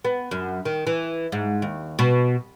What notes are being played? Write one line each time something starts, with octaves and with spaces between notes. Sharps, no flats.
B3
F#2
D#3
E3
G#2
D#2
B2